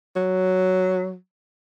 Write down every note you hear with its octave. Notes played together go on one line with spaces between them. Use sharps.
F#3